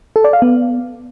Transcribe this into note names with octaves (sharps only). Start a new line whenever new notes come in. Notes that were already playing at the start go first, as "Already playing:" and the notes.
A4
D5
F5
B3